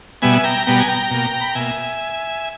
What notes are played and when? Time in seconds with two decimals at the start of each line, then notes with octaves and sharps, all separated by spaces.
0.22 B2 G3 B3 E5 G#5
0.38 G#5
0.44 G5 A#5
0.66 B2 G3 B3 G5 A#5
0.80 G#5
0.88 G5 A#5
1.11 B2 A#3
1.41 B5
1.49 A#5
1.55 B2 A#3 E5 G#5